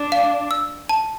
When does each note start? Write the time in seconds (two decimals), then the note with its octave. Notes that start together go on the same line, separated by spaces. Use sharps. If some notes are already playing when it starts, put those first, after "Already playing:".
Already playing: D4
0.12 F5
0.51 E6
0.89 A5